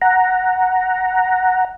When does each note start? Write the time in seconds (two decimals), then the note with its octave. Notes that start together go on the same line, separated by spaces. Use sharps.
0.02 F#5 A#5